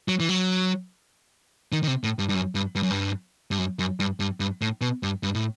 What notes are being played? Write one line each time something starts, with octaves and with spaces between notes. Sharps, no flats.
F#3
E3
F#3
D#3
D#3
C3
A2
G2
G2
F#2
G2
G2
F#2
G2
G2
F#2
F#2
G2
G2
G2
A2
B2
G2
G2
A2